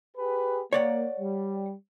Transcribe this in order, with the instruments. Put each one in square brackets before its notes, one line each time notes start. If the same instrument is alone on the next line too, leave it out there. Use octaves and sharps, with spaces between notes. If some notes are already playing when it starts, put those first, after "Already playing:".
[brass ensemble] G4 G#4 B4
[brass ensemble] A#3 [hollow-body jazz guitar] C#5 D5 F#5
[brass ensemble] G3